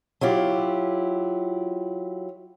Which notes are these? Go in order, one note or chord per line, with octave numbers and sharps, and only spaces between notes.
F#3 E4 F4 G4